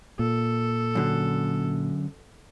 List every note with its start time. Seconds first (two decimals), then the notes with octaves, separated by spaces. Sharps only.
0.19 A#2 A4
0.95 F#2 D3